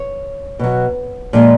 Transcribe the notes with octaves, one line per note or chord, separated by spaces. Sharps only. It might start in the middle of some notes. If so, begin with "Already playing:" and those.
Already playing: C#5
B2 F#3
A#2 F3 G#3